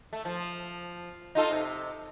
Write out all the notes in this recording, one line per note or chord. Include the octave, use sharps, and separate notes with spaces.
A3
F3
D#4 F4 A4
C3